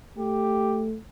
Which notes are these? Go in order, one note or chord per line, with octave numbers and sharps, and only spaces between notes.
A3 G4